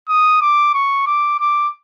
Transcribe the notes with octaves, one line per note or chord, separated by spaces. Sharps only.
D#6
D6
C#6
D6
D6